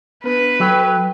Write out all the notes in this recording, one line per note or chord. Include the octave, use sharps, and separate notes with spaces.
B3 D4 B4
F#3 A4 G5 B5